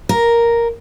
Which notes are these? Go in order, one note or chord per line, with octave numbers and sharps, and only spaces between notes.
A#4